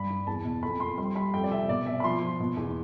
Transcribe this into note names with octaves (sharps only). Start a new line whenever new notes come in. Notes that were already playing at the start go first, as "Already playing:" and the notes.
Already playing: G2 B5
G2
E2 A5
B2
F2 B5
F2 C6
G3 C6
G3 B5
F2 G5
D5
C3 E5
B2 D5
B2 E5
B5
F3 C6
F3
B2
E2